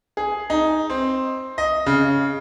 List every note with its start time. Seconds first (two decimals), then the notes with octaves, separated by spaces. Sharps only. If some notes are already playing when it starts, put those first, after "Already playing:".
0.17 G#4
0.50 D#4
0.90 C4
1.58 D#5
1.86 C#3